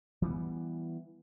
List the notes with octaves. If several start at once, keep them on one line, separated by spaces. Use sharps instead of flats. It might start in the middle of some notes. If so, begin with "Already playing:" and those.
E3 G3 G#3 B3